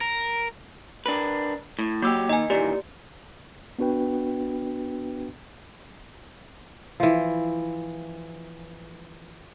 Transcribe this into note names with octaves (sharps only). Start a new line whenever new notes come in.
A#4
D4 A#4 B4
A2
F#3 A#3 G4 D6 E6
D#3 D#5 G#5
A#2 D#3 E3 G4 D5
B3 D4 F#4 B4 G5
E3 F3